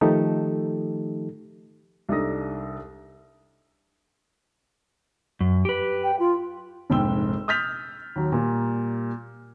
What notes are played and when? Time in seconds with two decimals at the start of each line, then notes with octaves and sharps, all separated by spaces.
0.01 D#3 F3 A3 D#4 G4 A4
2.09 C2 D4 D#4 A4 D#6 A#6
5.41 F#2
5.65 G4 B4
6.03 G5
6.19 F4
6.90 F1 A#1 G#2 G5 E6 G7
7.48 D#6 F6 G6 A6 B6 F7
8.16 D#2 F#3 A#5
8.32 A#2 G3 A#3